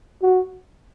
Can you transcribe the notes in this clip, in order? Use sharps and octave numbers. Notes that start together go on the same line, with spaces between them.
F#4